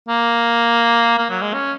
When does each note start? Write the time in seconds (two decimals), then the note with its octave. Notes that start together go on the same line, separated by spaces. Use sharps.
0.09 A#3
1.18 A#3
1.30 F#3
1.41 G#3
1.54 C#4